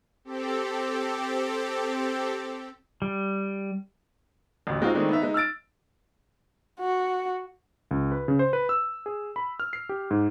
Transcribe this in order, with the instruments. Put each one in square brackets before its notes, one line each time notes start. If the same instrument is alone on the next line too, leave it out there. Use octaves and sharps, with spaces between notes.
[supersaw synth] C4 G4 A4
[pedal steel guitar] G3
[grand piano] A1 D2
G#3 C4 D#4 F4 F#4
D#3 G#3 A3 C4 D4 D#4
B3 D#4 E5
G#3 D#4
E6 F6 A6 D7
[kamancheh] F#4
[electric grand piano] C#2
B4
C#3
C5
B4
E6
G#4
B5
F6
C7
G4
G#2